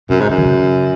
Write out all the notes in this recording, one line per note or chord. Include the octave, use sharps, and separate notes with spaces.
F#2 C3
G#2
F#2 C#3
D#3
C#3